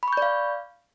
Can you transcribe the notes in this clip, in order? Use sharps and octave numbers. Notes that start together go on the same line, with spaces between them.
D5 F5 B5 C#6 G6